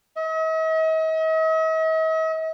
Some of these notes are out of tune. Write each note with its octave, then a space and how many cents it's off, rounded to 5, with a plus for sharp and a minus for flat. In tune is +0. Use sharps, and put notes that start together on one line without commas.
D#5 +45